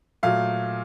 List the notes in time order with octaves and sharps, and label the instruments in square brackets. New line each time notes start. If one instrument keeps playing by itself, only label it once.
[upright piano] A#2 F#3 A3 F5